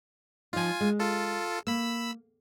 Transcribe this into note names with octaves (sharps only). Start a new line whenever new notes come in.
F3 D#4 F4 G#5
G#3
F4 A4
A#3 B5 E6